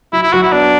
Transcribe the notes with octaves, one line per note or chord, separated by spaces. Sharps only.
F#3 E4
E4
F#3 F#4
E4
B3 D4